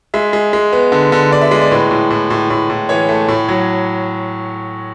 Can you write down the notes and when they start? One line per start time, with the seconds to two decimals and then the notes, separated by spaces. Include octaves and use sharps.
0.14 G#3 E5
0.33 G#3
0.53 G#3
0.73 B3
0.92 D3
1.12 D3
1.32 D3 D5
1.41 E5
1.51 G#3 D5
1.61 D5
1.71 A2 B4
1.91 A2
2.10 A2
2.30 A2
2.50 A2
2.70 A2
2.89 E3 C#5
3.09 A3
3.28 A2
3.48 F#3